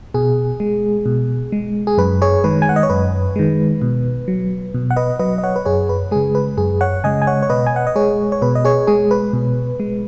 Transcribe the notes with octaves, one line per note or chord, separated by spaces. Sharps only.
B2 G#4
G#3
B2
G#3
G#4
F#2 B4
G#4 C#5
D#3 G#3 B4
G#5
F#5
D#5
C#5
F#2 B4
D#3 G#3
B2
F#3
B2
F#5
B4 D#5
F#3 B4 D#5
D#5
C#5 F#5
B4
F#2 G#4 C#5
B4
C#3 G#3 G#4
B4
F#2 G#4
C#5 F#5
C#3 G#3 D#5 G#5
G#5
C#5 F#5
C#5
B2 B4 D#5
G#5
F#5
D#5
G#3 G#4 C#5
C#5
B2 B4
D#5
G#4 C#5
G#3 G#4
B4
B2
G#3